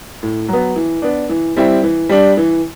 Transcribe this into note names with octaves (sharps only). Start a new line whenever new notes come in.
A2
F#3 B3
E3
B3 D4
E3
G3 C4 E4
E3
G3 D4
E3